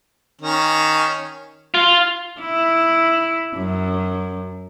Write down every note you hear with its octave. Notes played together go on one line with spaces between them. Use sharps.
D#3 C#4
F4
E4
F#2